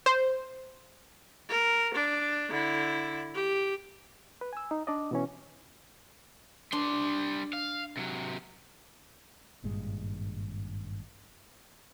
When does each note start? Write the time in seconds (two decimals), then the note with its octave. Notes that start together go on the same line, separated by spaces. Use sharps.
0.06 C5
1.49 A#4
1.94 D4
2.50 D3 E4
3.34 G4
4.41 B4
4.53 G#5 E6
4.71 D#4
4.87 D4 D5 D#5
5.11 B2 E3 C#4
6.72 G3 D4 C6
7.53 F5
7.97 C3 F#3
9.64 G#1 G2 A#2 G#3